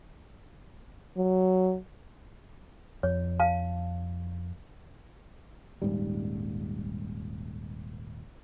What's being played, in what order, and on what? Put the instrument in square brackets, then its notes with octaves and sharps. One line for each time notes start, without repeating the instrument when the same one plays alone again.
[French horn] F#3
[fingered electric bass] F2 [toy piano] C#5
[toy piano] F5 A5
[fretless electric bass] D#1 G#2 G3